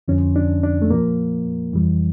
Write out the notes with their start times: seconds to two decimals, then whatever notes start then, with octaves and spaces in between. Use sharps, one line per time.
0.08 F2 D3 F3 C#4
0.36 D4
0.63 D4
0.82 A3
0.90 A#2 F3 A#3
1.73 F2 E3 G3